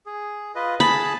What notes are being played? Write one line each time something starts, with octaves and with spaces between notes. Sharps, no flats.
G#4
F4 B4 D#5
G#4 A5 B5